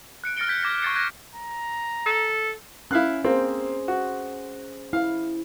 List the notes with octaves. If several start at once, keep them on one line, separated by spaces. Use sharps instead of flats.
F#6 C#7 D7
F6 A6 A#6 C#7 D7 G7
G6 G#6 B6
D6 G#6 A#6 B6 C#7
C#6 D6 G#6 A6 C7 C#7
F#6 G#6 A#6
A#5
A4
C#4 E4 F5 F#6
A#3 C4 G#4 C5
F#4
E4 F5